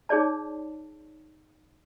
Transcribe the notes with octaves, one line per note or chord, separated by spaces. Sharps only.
D#4 G#4 C#5 D5 A5